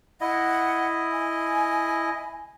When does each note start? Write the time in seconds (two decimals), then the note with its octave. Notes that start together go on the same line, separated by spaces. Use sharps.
0.21 E4 D#5 F#5
1.12 G#5